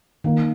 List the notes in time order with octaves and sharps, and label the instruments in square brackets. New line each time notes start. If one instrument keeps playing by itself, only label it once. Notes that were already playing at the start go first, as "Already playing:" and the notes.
[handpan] D#3 [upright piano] A#3